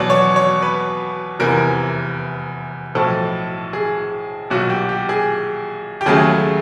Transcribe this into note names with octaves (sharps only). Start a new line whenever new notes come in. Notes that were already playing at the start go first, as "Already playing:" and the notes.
Already playing: E2 B2 F#3 D5
C#5
C#5
B4
F1 E2 C3 E3 A#4
B1 A2 F3 A4
G#4
B1 A#2 F#3 F#4
G4
G4
G#4
G4
D#2 C#3 F#3 A3 G#4